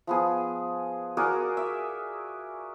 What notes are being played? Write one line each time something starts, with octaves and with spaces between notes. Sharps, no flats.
F3 B3 G#4
F#4 G#4 A#4 D5
E5